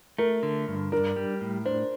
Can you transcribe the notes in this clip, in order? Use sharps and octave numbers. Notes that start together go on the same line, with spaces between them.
A3 A#4
D3
G2
D4 A#4
G3
A2
D4 C5